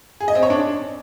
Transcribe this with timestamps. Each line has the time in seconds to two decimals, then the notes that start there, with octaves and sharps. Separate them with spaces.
0.20 G#4
0.28 D#5
0.35 C4
0.43 C#5
0.50 D4